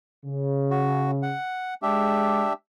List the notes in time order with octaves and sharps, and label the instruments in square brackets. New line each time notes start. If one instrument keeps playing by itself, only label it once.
[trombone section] C#3
[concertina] F#4
F#5
[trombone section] G#3 [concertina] D4 G4 E5